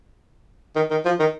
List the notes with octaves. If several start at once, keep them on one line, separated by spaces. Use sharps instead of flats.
D#3
D#3
F3
D#3